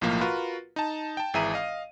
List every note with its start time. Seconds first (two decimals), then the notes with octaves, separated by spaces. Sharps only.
0.01 B1 A2 F3 A#3 F5
0.21 F4 F#4 A#4 B4
0.76 D#4 A5
1.17 G5 A5
1.34 G#1 E3 G#4 E5 A#5 D#7
1.54 D#5 F5